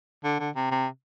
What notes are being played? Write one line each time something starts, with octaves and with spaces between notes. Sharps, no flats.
D3
D3
C3
C3